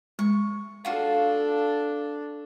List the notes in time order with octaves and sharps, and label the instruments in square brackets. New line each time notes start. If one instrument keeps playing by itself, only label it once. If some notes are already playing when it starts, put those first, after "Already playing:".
[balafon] G#3 [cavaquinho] C#6
[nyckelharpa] D4 A4 [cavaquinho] F4 F#4 F5